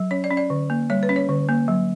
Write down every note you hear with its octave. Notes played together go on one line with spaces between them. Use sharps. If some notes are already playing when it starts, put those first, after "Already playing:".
Already playing: F#3
C#4 C#5
D5
C#4
D5
D3
A#3
G3 C#5
B4
C#4
C#5
D3
A#3
F#3